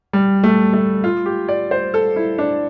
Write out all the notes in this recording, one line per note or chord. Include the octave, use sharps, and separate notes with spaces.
G3
A3
A3
F4
G4
D5
C5
A4
E4
D4